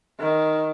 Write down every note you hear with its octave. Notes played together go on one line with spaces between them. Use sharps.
D#3